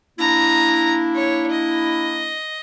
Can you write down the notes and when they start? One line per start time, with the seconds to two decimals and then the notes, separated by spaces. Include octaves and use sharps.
0.19 A#3 D4 E4 A#5
1.15 C#5
1.51 D#5